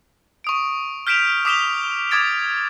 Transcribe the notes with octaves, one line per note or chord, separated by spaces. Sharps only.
C#6 D#6 D7
F6 G6 B6 D7 E7 F7
D6 D#6 B6 E7 F7 G7
D6 D#6 G#6 A6 D7